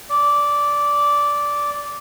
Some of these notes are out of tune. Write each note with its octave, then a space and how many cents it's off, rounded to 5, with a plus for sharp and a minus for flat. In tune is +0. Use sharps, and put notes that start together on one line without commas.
D5 -10